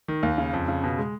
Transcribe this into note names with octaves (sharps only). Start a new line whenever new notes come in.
D#3
D#2
C#3
F2
C#3
B2
G#3